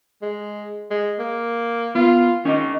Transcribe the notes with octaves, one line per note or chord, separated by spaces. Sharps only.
G#3
G#3
A#3
B3 F4
D#3 C#4 D#5